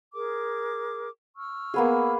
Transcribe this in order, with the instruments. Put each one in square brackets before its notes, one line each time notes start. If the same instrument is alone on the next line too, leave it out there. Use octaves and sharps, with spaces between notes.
[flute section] G#4 A#4 D6
C#6 E6 F6
[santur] A#3 B3 G#4